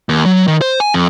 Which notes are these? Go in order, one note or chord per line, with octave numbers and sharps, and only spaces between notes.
D#2
F#3
D#3
C5
G#5
F2